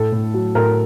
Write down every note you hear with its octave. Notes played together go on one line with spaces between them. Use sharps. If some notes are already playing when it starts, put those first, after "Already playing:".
Already playing: A2 A4
A2
F#3
A2 A#4